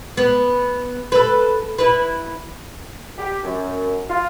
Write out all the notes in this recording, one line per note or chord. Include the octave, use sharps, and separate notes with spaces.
B3
A4 B4
E4 B4
G4
F#2
F4